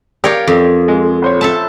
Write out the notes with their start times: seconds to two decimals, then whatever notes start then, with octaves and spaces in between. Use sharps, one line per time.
0.24 G4 A#4 C#5 D5 F5 G5
0.47 F2
0.88 G#3
1.22 A#1 C5 C#5
1.41 A4 E5 A5